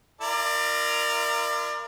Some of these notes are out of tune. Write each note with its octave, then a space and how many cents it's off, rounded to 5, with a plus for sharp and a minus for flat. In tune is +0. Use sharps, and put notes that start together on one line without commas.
F4 -45 A#4 +0 D5 +30